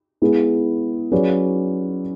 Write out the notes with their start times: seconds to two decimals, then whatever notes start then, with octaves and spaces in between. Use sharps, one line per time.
0.22 G#3 B3 E4 G#4 B4
1.12 F#3 C#4 G#4 B4 D5